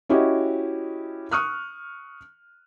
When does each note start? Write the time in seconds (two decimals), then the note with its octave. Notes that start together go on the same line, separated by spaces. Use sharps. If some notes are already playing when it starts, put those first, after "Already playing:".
0.09 C#4 E4 F#4 G4 D#5
1.31 C#6 D#6 F6 F#6